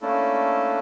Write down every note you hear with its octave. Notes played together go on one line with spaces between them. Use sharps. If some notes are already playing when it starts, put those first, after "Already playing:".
A3 A#3 C#4 D4 E4 A4